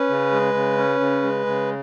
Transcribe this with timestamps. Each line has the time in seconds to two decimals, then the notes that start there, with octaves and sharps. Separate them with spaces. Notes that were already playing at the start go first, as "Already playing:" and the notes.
Already playing: C#4 B4
0.09 C#3
0.32 G#3
0.54 C#3
0.77 C#4
1.00 C#3
1.23 G#3
1.46 C#3